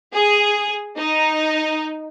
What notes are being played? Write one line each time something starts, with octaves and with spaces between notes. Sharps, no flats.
G#4
D#4